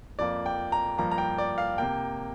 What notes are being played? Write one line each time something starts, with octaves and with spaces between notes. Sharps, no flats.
F2 F3 A#3 D5
G5
A#5
G2 F3 A#3 A#5
A#5
G5
D5
F5
C3 A#3 G5